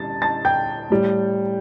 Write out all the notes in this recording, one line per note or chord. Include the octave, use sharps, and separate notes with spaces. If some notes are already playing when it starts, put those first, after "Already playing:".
Already playing: G3 A5 A6
A5 A6
G5 G6
A2 G3